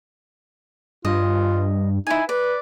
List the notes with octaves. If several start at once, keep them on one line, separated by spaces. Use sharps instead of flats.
G2 F4 D#5
D#4 E4 G#5
B4 D5